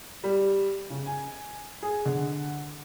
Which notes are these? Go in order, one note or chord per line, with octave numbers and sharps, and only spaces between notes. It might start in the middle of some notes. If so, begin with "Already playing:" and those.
G3
C#3
G#5
G#4
D3